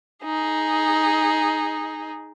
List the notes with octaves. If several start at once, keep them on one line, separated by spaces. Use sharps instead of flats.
D#4 G#4